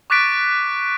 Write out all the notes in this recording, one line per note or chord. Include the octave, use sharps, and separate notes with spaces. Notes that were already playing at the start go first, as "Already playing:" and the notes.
C#6 D6 F#6 A6 B6 D7